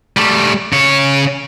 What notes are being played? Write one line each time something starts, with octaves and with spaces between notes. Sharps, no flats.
G3 A3
C#3 C#5